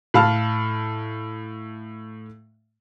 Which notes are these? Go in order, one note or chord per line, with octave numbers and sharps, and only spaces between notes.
A2 F5 A5 F6